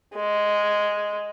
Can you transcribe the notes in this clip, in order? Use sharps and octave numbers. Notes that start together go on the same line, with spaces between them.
G#3